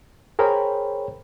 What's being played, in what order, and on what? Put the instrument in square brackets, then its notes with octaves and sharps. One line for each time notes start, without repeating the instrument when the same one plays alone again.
[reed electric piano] G#4 A#4 C5 C#5 G5 B5